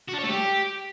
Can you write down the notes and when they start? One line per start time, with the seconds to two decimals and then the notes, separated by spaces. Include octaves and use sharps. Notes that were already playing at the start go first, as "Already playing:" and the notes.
0.09 F#4
0.14 D4
0.19 C#5
0.24 A3
0.29 G4